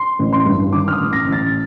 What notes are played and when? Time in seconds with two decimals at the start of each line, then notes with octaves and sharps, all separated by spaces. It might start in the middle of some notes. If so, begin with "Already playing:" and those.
Already playing: C6
0.19 A1
0.33 C6
0.46 G2
0.73 D#3 D6
0.88 F6
0.93 D#6
0.99 A1
1.13 A#6
1.26 A1
1.32 A6